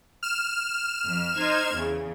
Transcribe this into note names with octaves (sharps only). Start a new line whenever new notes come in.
F6 E7
F2
D#4 C5 G#6
E2 C#3